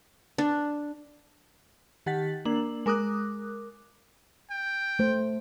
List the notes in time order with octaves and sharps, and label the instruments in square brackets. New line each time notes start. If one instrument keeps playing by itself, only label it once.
[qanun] D4
[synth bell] D#3 G4 F#5 A6 B6
A#3 D4 F#7
G#3 A#4 D6 D#6 F#6
[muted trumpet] G5
[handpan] A3 C5